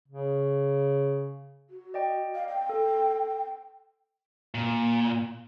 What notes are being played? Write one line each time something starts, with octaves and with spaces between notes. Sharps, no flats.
C#3
F#4
D5 D#5 G5
F5
G5
A4
A#2